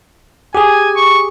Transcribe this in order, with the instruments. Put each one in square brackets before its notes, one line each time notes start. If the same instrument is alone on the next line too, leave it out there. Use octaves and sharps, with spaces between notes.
[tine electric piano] G4 G#4 [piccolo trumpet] G#5
[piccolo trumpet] C#6